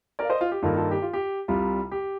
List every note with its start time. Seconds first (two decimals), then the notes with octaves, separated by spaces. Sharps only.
0.19 A#4 D5
0.25 F5
0.30 C5 D#5
0.41 F4
0.52 G4
0.62 G2 D#3 A#3 F4 A4
0.77 F4 A4
0.91 G4
1.02 F4
1.13 G4
1.48 C2 C3 G3 F4
1.92 G4